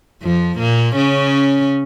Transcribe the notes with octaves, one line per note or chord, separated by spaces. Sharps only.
F2 F3
A#2 A#3
C#3 C#4